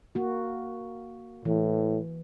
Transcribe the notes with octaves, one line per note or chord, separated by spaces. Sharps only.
A#3 F#4
A2 E3